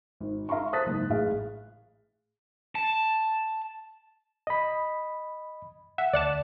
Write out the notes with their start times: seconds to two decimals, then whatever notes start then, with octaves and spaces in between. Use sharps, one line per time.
0.20 G#1
0.49 E5 F5 A#5 C6 C#6
0.73 C5 D#6 F#6 A6 B6
0.86 F#1 G#2
1.10 A1 G#4 F5
2.75 A5
4.47 D#5 B5
5.98 E5 F#5
6.13 D2 D5 F#5 A5